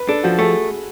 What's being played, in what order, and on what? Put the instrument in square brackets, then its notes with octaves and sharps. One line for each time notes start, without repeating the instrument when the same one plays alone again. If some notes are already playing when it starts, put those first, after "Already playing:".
Already playing: [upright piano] B4
[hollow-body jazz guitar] D4 [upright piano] A4
[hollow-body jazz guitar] F3 [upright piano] F#4
[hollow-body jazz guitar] A3 [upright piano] G#4